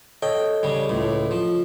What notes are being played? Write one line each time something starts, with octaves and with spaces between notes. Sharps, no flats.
A4 C#5 D#5 G5
C#3 G3
C#2 A2
F3